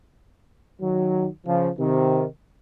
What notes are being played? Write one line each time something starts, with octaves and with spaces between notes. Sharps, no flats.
D#3 F#3
C#3 F3
C3 D#3